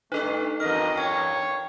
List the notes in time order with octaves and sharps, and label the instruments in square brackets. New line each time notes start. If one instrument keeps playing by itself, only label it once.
[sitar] G2 D4 B4 [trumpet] A3 [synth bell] D#4 A4
[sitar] E2 G2 A#4 [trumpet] D#5 [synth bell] F6
[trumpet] C#5 [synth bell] G5